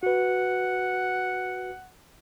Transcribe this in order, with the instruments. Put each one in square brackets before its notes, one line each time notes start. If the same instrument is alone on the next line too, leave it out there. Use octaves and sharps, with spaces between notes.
[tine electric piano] F#4 B4 [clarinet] F#5